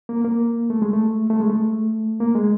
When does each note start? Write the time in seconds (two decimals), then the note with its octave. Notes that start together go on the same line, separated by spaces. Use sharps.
0.09 A#3
0.24 A#3
0.70 A3
0.82 G#3
0.93 A3
1.30 A3
1.40 G#3
1.50 A3
2.20 A#3
2.35 G#3